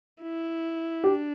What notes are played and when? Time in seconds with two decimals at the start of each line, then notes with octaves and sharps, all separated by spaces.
0.22 E4
1.04 D4 G4